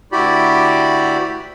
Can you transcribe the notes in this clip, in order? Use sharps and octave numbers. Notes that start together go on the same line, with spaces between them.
D2 E4 F#4 G4 D5 B5